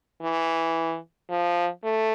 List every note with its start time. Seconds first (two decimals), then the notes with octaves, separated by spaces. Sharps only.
0.22 E3
1.30 F3
1.84 A3